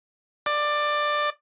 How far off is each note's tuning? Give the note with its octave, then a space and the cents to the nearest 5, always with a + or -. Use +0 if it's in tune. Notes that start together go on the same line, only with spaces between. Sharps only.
D5 +15